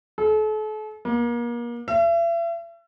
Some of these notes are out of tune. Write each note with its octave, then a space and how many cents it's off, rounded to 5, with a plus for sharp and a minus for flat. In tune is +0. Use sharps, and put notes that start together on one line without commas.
A4 -40
A#3 +35
E5 +40